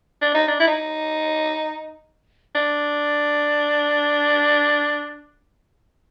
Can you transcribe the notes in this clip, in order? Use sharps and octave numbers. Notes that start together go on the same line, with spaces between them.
D4
D#4
D4
E4
D#4
D4